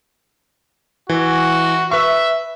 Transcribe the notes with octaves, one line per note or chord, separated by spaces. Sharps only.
E3 F#4
B4 E5 C#6